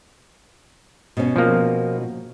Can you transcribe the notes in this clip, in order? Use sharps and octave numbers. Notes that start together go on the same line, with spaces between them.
B2 C#4
F3 A#3